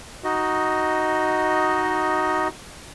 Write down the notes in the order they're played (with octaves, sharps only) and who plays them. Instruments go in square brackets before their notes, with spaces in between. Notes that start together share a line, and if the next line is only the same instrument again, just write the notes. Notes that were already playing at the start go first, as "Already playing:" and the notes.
[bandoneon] D#4 F#4 D#5